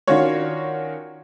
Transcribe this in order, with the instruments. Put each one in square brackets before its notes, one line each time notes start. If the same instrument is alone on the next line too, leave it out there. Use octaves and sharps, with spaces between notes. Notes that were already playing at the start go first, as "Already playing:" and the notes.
[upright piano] D#3 C#4 D4 F4 F#4 C#5